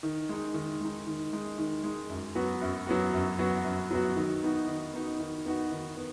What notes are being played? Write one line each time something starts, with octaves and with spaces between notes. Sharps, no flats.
D#3
G#3 D#4
D#3
G#3 D#4
D#3
G#3 D#4
D#3
G#3 D#4
F#2
F#3 B3 F#4
F#2
F#3 B3 F#4
F#2
F#3 B3 F#4
F#2
F#3 B3 F#4
D#3
B3 D#4 F#4
D#3
B3 D#4 F#4
D#3
B3 D#4 F#4
D#3
B3